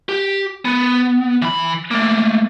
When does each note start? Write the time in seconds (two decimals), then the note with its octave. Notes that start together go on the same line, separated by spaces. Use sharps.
0.09 G4
0.65 B3
1.42 E3 B5
1.91 A3 A#3